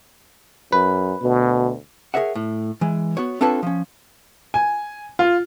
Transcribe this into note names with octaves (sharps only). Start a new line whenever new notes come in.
F#2 B4
D2 B2
G#4 A#4 C#5 E5 F#5
A2
E3 G#3
B3 F#4 C#5
C4 D4 F4 A4 B4 C#5
F3 C#4
G#5
F4